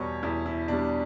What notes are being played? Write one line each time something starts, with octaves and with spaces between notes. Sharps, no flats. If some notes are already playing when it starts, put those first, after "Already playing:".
Already playing: E2 B2 G3 C#5
E2 E4
E4
B2 G3 D4